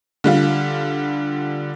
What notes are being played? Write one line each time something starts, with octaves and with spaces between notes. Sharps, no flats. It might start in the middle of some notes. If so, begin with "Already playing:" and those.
D3 G3 F4